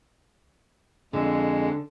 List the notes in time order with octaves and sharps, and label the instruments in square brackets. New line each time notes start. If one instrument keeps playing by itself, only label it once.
[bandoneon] F2 G#3 [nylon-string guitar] D3